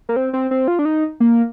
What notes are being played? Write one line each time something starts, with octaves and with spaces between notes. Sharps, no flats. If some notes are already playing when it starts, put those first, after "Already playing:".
A#3
C4
C4
C4
F4
D4
D#4
A#3